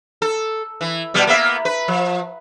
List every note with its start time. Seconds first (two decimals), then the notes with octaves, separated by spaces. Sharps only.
0.22 A4
0.81 E3
1.14 B2 G3 B3
1.27 A#3 B3 E5
1.65 B4
1.88 F3